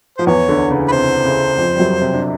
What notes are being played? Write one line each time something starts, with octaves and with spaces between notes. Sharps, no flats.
F3 C5
E2 E3 C#5
D2 D3
C#3
B4
C3 C5
C#3
F2 F3
G3
F#2 F#3
C3 C4
D4